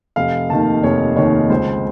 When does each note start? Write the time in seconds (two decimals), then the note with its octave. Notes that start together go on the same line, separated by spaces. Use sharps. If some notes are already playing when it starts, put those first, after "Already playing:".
0.16 F1 F5
0.50 D#2 D#3 A5
0.83 F1 C#5
1.16 D#2 D#3 C#5
1.50 C#2 C5